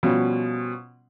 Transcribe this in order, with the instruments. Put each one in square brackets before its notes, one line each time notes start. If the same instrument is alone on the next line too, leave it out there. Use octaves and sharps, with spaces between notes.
[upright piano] B2 F3 G3 C#4